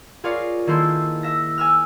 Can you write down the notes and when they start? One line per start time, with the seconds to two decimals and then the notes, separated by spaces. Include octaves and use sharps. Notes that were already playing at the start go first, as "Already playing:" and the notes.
0.24 F4 G#4 A#4 C#5 D5 F5
0.67 D#3 A#3 E4 G#4 A4 C5
1.23 E5 A#6
1.58 G#5 E6 F6